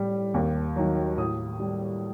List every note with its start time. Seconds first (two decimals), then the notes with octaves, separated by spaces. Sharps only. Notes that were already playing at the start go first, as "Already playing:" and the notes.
Already playing: A2 G3
0.34 D#2
0.76 D#3 F#3
1.17 A2 D#6
1.60 G3